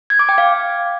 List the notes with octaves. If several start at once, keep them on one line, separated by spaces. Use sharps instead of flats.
G#6
D6
G5
F5